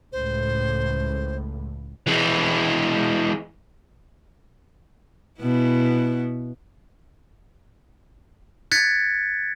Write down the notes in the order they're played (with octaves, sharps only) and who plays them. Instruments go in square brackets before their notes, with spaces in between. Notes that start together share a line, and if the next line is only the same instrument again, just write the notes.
[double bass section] C#2 A2 [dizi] C5
[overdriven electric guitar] E3 G#3
[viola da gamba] B2 B3 E4
[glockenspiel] F#6 G#6 A6 B6 C#7